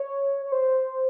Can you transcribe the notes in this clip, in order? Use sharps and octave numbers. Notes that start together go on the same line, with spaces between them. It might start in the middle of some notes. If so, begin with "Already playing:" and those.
Already playing: C#5
C#5
C5